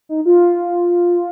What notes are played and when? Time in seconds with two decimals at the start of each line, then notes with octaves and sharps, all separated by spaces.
0.09 D#4
0.25 F4